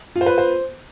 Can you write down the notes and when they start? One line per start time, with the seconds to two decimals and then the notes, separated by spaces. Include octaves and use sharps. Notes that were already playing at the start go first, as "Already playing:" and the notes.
0.16 F4
0.21 C5
0.26 B4
0.38 C5